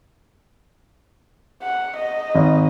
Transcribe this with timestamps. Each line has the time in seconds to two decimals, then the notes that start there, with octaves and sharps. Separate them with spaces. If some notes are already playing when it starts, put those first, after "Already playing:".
1.63 F#5
1.96 D#5
2.35 G#1